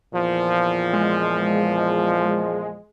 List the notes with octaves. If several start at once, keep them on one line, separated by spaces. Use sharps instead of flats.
E2 A#2 F3
G#3